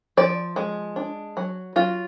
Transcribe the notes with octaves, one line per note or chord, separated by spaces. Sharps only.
F3 D5
G#3
D4
F#3
F#3 F4